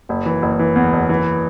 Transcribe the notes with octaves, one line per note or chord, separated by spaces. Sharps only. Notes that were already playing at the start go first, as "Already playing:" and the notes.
F#1
E3
F#1
E3
E2
F#1
E3